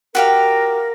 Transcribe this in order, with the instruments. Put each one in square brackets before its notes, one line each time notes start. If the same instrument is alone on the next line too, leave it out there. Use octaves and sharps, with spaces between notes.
[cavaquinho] F#4 G4 F5 [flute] A#4